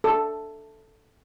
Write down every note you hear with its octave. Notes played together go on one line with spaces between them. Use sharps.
A4